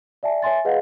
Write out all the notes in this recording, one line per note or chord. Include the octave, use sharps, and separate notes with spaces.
D5 E5 G#5 A5
C#5 E5 G#5 C6 A6
G#4 B4 D#5 F5 F#5